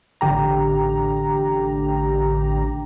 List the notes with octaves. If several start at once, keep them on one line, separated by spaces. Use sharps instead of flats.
A1 D3 G4 A#5